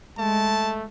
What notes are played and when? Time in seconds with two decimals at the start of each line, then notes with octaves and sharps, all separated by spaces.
0.19 G#3 A3 A5